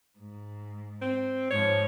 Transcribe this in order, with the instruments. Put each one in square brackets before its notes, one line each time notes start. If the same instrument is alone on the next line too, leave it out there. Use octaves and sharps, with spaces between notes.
[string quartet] G#2
[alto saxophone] C4
[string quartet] G#2 F3 [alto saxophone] C#5